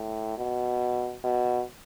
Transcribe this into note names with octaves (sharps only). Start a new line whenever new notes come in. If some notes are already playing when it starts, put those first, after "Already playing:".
Already playing: A2
B2
B2